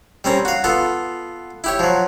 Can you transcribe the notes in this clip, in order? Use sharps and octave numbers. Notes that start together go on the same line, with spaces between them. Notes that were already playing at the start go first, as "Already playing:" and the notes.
G3 C4 C#4 A#4
F#4 F5
B3 F4 A4
E4 G4 C#5
F3 F#3